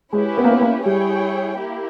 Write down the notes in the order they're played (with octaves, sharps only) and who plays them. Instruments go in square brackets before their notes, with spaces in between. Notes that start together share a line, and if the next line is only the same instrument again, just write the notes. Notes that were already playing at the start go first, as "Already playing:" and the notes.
[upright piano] G#3 [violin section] C#4 E4 G4 B4
[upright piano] B3
A#3
B3
A#3
[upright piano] G3 [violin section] E4 G#4 C#5 G5
[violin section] A#3 E4 G4